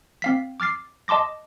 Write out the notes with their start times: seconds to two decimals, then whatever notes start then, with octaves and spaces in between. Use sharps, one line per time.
0.22 C4 F5 B6
0.60 D6 F6 A6 C7
1.08 D#5 A5 C6 D6 A#6